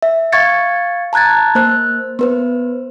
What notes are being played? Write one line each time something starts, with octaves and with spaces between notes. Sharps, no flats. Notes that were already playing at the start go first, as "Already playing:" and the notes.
E5
F5 C#6 G#6 A6 C#7
A5 A#5 F#6 G#6 A6
A#3 C5 F#6
B3 B4 C5